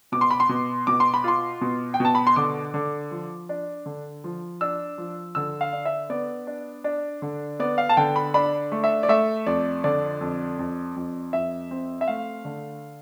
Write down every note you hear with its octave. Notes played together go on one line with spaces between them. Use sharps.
B2 D6
C6
B5
C6
B2
B2 D6
C6
B5
F4 C6
B2
G5
B2 A5
B5
C6
D3 D6
D3
F3
D4
D3
F3
D4 E6
F3
D3 E6
F5
D4
E5
B3 D5
D4
D4
D3
B3 D5
F5
A5
D3 G5
B5
D4 B5
A3
E5
D5
A3 E5
F2 D5
D3 D5
F2
F2
F2
F2 E5
C4
E5
A3 F5
D3